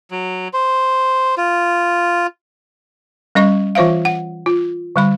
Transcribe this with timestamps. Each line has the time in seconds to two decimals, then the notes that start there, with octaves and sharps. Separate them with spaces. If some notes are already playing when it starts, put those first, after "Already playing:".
0.11 F#3
0.53 C5
1.38 F4
3.35 G3 C#4 D#5 C#6
3.75 E3 F4 C5 E5 F5
4.05 F#5
4.46 F4
4.96 D3 G3 B5